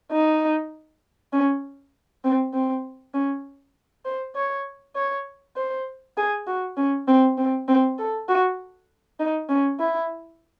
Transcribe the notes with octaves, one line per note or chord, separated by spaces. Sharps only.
D#4
C#4
C4
C4
C#4
C5
C#5
C#5
C5
G#4
F#4
C#4
C4
C4
C4
A4
F#4
D#4
C#4
E4